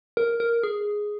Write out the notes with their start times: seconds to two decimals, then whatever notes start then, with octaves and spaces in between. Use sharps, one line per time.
0.17 A#4
0.40 A#4
0.63 G#4